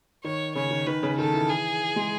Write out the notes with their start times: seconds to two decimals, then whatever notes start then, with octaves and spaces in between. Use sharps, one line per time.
0.24 D#3 C#5
0.55 C#3 C#5
0.71 D#3
0.86 D#3 B4
1.03 C#3
1.18 D#3 A4
1.34 E3
1.49 G#4
1.96 G#3